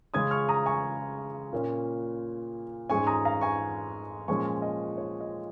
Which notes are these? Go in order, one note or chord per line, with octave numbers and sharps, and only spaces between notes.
C#3 G#3 C#4 D#6 G#6
C#6 F6
A#5 D#6
G#5 C#6
A#2 A#3 C#4
G#2 G#3 C#4 G#5 C#6
A#5 D#6
F5 A#5
G#5 C#6
A#2 F3 G#3 C#4 G#5 C#6
D#5
C#5
D#5